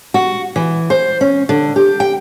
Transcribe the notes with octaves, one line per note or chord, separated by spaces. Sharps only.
F#4
E3
C5
C#4
D3
G4
G5